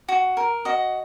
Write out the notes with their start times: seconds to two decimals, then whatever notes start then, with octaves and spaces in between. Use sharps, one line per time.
0.08 F#4
0.37 A#4
0.65 F#4 D#5